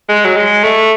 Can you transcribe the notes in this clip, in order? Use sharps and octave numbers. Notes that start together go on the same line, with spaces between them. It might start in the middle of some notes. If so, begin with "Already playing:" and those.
G#3
F#3
G#3
A3